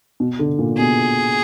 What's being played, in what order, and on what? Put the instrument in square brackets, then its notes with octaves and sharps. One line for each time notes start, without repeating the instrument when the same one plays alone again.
[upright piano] B2
D3
A#2
[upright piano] B2 [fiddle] G#4